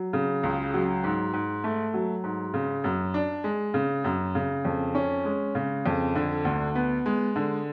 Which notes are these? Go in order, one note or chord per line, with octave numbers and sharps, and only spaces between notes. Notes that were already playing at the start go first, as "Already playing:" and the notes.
Already playing: F#3
C#3
C#2
F#3
G#2
G#2
A3
F#3
G#2
C#3
F#2
D4
G#3
C#3
F#2
C#3
F2
C#4
G#3
C#3
F2
D3
D2
B3
G#3
D3